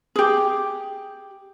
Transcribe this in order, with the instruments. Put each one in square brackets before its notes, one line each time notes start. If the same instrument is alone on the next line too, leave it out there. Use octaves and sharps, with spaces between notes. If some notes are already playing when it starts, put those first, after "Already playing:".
[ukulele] G4 G#4